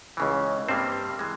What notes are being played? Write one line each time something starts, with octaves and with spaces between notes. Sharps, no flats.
C#2 C#3 E3
G2 G3 A#3 C4 C5
E3 G#3